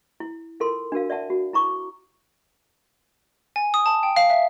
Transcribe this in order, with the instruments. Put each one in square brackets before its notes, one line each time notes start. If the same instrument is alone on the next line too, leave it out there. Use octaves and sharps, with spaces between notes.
[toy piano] E4
E4 F4 A4 A#4 C6
D4 F#4 A#4 F5
D5 E5 F#5 A5
F#4
E4 A#5 C#6 D6
[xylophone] G#5
D#6
A5
G5
F5
E5